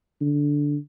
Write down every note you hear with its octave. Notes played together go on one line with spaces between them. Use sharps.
D3